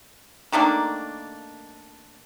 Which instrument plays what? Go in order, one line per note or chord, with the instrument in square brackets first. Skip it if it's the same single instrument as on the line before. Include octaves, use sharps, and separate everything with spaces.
[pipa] D#3 A3 A#3 D4